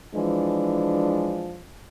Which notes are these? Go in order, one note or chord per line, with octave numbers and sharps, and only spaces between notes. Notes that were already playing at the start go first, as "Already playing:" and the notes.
E3 F3 G#3 D4